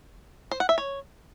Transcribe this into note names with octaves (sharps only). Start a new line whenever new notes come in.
C5
F#5
E5
C#5